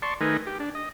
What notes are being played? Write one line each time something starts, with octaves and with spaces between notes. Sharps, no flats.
D5 A5 C6 C#6
D#3 A3 D#4 A#4 B4 G#5
G4
D4
D#5